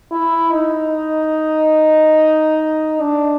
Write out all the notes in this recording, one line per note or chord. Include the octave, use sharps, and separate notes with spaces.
E4
D#4
D4